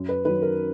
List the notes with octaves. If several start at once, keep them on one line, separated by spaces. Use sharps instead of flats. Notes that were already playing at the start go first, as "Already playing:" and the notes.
Already playing: F#2
B4
D#3 F#3 B4
A#4